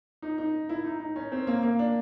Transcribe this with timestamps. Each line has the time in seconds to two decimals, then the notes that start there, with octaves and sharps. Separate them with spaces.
0.22 D#4
0.38 D#4
0.69 E4
0.85 D#4
1.00 D#4
1.16 C#4
1.32 C4
1.47 A#3
1.63 A#3
1.79 D4